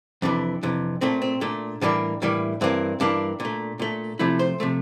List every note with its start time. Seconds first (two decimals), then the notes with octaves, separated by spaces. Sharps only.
0.22 F2 C3 E3 D4
0.63 F2 C3 E3
1.01 A#2 A3 C4
1.22 C4
1.41 A#2 A3 D4
1.81 A2 E3 G3 A#3 D4
2.22 A2 E3 G3 A#3
2.61 G2 E3 A#3 C4
3.00 G2 E3 A#3 D4
3.40 A#2
3.45 A3
3.79 A#2 A3
4.19 C3 F3 A3 E4
4.39 C5
4.60 C3 F3 A3